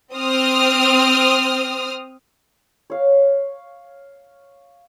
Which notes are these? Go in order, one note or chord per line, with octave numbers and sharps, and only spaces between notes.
C4 D#6 F6
C#5 F5